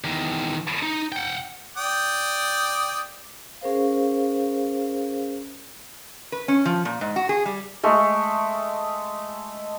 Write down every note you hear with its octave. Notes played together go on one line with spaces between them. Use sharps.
E2 D#3
D#4
F#5 G5
D5 G5 D#6
C#4 G#4 A#4 C5 F5
B4
C#4
F3
A#2
G#2
F#4
G#4
G3
G#3 A3